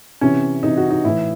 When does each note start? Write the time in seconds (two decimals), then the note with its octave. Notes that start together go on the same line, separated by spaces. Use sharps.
0.21 C3 E3 C#4
0.63 C3 E3 D#4
0.77 F#4
0.91 D#4
1.04 A2 E3 E4